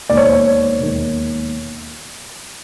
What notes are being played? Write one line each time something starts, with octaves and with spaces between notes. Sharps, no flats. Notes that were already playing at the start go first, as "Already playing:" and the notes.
E1 D#2 D#3 D5
C#5
C5
C#5
E1 D#2 D#3